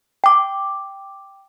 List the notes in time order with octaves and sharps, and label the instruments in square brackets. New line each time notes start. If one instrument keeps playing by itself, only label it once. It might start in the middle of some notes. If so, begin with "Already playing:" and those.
[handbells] G5 D6